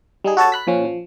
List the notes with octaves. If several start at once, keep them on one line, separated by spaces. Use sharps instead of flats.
G3 D#4 G#4
F#4 A4 C#5 A5
B5 F#6 B6
A#2 F3 C#4
F3